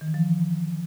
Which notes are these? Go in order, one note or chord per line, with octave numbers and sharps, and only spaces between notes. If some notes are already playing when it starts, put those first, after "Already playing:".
D#3
E3
F3